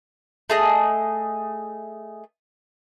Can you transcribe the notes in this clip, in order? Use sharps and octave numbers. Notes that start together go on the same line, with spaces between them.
A3 G#4 D#5